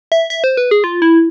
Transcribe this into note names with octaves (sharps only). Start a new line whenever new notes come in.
E5
E5
C5
B4
G#4
F4
E4